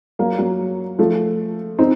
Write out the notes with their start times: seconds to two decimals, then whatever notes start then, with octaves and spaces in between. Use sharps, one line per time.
0.19 F#3 A#3
0.38 F#3 A#3
0.99 F3 A3
1.79 C4 D#4